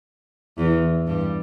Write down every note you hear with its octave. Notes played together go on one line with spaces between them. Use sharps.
E2 E3
G2 G3